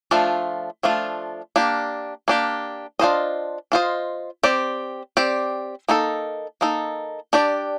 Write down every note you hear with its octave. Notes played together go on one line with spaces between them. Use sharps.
F3 A3 D4 F4
F3 A3 D4 F4
A#3 D4 G4
A#3 D4 G4
D4 F4 C5 D#5
D4 F4 C5 D#5
C4 G4 D5
C4 G4 D5
A#3 D#4 A4
A#3 D#4 A4
D4 G4 D5